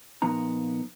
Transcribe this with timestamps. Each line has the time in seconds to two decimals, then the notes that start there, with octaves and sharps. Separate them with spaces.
0.22 A#2 F3 B3 D#4 A#5